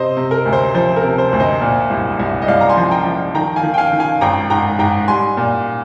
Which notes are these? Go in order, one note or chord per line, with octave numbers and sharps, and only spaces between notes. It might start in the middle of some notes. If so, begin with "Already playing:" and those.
Already playing: C3 C5 D#5
C3
A#4
D2
C5
F3 C5
A#4
C3
C5
D2
C5 D#5
A#2
C2
C2
D#5
C2 D5 F5
A#5
G#5 C6
F3
G5 A#5
F3
D#3 G5 A#5
F5 G#5
D#3
G5
F5 G#5
D#3
F5 G#5
G#1 G5 A#5
G#2 G5 A#5
G#2 G5 A#5
G3 G#5 C6
A#2